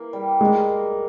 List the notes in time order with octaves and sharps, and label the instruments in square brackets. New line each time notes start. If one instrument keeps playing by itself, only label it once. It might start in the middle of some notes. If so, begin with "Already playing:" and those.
Already playing: [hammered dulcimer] E3 A#3
G3
[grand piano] G#3 [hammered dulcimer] A#3
[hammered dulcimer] A#3